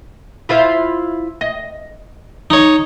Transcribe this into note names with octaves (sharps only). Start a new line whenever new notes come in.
E4 F4 C5
D#5
D#4 C#5